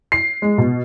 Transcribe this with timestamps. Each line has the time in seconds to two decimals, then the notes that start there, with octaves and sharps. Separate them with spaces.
0.12 C7
0.42 G#3
0.58 B2